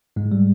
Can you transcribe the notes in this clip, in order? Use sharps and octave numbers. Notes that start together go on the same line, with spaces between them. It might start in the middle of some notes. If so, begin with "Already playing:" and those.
G#2 G#3
G3